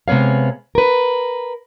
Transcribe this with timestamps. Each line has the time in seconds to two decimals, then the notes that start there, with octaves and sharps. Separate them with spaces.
0.08 C3 G#3 B3 C#5 F5
0.75 A#4 B4